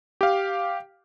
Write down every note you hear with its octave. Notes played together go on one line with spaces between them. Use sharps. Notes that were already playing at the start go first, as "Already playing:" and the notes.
G4 F5